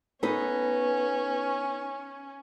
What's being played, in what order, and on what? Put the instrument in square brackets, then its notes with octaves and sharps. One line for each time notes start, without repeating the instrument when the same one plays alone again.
[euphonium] B3 [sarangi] C#4 [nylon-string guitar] D#4 A4 B4